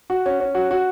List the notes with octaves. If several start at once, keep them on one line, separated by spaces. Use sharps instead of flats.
F#4
C#4
C#4
F#4
F#4